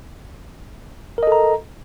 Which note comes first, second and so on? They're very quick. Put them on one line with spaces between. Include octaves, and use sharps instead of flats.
A#4 D#5 A4 A#5